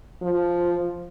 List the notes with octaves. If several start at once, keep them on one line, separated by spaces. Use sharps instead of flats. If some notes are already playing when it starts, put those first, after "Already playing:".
F3